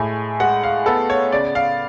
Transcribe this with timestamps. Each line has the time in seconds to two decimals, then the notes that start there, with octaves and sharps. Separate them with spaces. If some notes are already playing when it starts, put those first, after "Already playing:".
Already playing: A2 G#3 G#5
0.40 G#3 F#5
0.63 F5
0.86 B3 A4
1.10 C#5
1.32 C#3 D5
1.55 F5